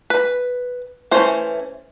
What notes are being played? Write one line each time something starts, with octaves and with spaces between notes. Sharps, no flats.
B4
E3 A3 C#4 C5